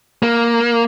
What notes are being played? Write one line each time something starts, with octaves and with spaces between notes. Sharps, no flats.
A#3